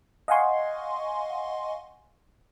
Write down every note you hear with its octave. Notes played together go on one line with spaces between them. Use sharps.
D#5 F5 F#5 G#5 C6 C#6